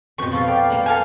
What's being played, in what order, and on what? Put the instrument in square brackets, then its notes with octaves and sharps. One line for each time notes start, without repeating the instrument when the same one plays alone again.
[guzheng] F2 B2 [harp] B4 G6 [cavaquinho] C#6
[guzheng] F3 A4 [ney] F5
[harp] D5 G5
[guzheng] A#3 D4
[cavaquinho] A4 F5 G#5